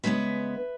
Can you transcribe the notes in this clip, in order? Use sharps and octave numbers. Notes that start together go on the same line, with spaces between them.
C#3 G#3 B3 B4 E5